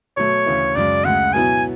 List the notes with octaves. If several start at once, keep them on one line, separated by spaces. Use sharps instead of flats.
B2 F#3 A3 C#5
D2 C#3 E3
F#2 C#3 G#3 D5
D2 C#3 G#3 F#5
B2 F#3 B3 E4 G#5